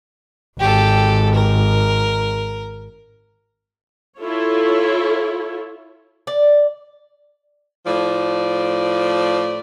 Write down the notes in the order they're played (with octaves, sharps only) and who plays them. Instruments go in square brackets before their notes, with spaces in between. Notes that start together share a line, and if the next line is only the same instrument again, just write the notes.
[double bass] G#1 [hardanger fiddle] G4 A4
[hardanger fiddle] A#4
[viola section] E4 F4 A4 C#5
[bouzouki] D5
[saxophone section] A2 F3 D5